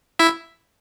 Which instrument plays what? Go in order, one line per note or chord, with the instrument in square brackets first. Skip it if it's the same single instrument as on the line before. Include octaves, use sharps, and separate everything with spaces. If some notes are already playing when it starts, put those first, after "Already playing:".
[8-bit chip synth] E4 E5